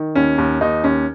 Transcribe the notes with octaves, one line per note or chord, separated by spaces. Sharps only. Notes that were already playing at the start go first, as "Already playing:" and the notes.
Already playing: D#3
D#2 C#4
D#2
D#2 D#4
D#2 C#4